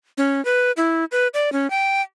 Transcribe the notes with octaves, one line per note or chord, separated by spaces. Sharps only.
C#4
B4
E4
B4
D5
C#4
G5